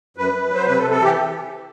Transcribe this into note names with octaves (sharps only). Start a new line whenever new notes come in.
F#2 B4
F#2
F#3 C5
C3 B4
A4
C3
A4
E3 G4